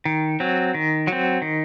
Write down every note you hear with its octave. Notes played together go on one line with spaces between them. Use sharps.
D#3
F#3 C4
D#3
F#3
C4
D#3